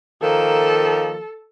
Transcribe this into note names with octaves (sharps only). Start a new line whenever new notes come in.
D#3 F3 A#3 A4